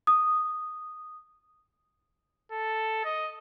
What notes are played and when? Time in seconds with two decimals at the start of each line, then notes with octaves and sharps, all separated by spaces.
0.07 D#6
2.52 A4
3.04 D#5